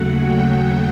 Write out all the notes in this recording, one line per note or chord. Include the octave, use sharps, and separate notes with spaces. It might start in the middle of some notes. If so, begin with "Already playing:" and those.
Already playing: D#2 C#3 F#3 A3 F#5
G5